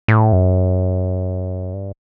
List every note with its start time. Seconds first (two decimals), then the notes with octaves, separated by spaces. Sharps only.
0.08 A2
0.33 F#2
1.74 G2